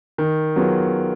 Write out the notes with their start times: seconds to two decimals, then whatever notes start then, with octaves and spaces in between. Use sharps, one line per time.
0.18 D#3
0.56 F#3 B3 F4 G#4